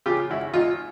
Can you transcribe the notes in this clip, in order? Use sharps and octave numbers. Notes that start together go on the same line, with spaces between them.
C#3 F4 G4
G#1 E4 F#4
G#1 D#4 F4